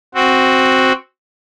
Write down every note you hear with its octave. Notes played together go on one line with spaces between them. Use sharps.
C4 F#4